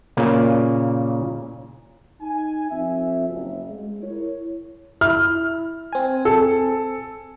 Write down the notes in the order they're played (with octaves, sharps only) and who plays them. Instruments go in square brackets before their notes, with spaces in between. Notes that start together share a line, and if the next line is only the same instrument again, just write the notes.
[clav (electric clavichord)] A#2 C#3 A#3
[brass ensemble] D#4 G#5
F2 C4 E5
F#1
G#3
E4 A#4 C#5
[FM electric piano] E4 [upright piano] F6
[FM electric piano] C4 G#5
[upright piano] A4